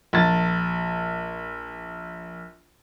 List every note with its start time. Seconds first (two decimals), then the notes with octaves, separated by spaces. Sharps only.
0.13 A#1 A6